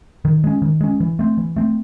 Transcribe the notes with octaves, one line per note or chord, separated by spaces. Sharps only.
D#3
G#3 C#4
D#3
G#3 C#4
E3
A3 C4
E3
A3 C4